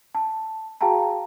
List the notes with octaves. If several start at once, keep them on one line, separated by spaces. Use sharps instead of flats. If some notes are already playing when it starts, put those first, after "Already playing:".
A5
F#4 G#4 F5 G5 A5 A#5